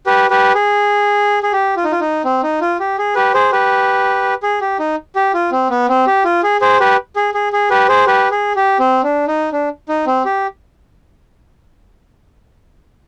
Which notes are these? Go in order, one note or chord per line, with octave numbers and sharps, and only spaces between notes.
G4 B4
G4 B4
G#4
G#4
G4
F4
D#4
F4
D#4
C4
D#4
F4
G4
G#4
G4 B4
G#4 C5
G4 B4
G#4
G4
D#4
G4
F4
C4
B3
C4
G4
F4
G#4
G#4 C5
G4 B4
G#4
G#4
G#4
G4 B4
G#4 C5
G4 B4
G#4
G4
C4
D4
D#4
D4
D#4
C4
G4